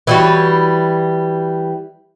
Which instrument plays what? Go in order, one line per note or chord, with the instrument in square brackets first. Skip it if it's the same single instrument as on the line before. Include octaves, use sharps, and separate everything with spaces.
[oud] E3 G3 F#4